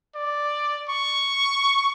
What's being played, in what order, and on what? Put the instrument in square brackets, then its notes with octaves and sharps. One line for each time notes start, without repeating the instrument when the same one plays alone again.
[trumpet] D5
C#6